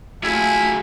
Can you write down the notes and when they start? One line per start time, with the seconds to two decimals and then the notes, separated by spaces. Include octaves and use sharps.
0.23 F#3 A3 E4 F4 G#4